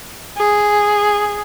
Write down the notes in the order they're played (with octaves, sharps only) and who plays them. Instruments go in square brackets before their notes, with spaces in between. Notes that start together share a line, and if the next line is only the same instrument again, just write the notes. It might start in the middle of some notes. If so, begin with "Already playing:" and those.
[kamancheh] G#4